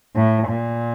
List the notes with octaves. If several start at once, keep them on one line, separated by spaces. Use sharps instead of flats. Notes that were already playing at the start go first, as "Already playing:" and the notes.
A2
A#2